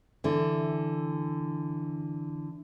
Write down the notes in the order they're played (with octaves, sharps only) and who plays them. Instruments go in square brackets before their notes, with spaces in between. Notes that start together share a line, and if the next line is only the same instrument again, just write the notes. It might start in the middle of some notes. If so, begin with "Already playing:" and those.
[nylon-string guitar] D3 E3